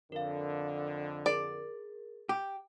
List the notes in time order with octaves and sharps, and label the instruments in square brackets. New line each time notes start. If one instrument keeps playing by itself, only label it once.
[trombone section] F2 D3 [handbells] A#4 F5
[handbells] G#4 A#4 [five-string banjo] D5
[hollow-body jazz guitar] G4